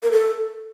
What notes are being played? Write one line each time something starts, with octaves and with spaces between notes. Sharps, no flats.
A#4
A4